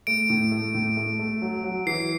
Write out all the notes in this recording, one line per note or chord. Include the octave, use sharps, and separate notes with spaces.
A3 D7
A2
A3
A2
A3
A3
F#3
F#3
E3 C7